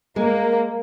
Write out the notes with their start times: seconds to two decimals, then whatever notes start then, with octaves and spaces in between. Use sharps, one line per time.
0.16 G#3 A#3